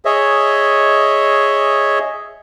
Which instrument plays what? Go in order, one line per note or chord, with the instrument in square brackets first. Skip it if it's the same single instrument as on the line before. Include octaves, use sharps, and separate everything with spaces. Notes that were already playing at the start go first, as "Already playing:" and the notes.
[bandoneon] G#4 C#5 D#5 E5